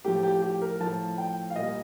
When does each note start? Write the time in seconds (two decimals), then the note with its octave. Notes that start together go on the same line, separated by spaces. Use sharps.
0.05 A2 F3 G4
0.23 G4
0.42 G4
0.61 A#4
0.80 A2 F3 A5
1.18 G5
1.50 F5
1.56 A#2 G3 D#5